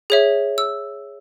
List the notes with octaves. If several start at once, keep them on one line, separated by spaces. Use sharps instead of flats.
G#4 C#5 E5
E6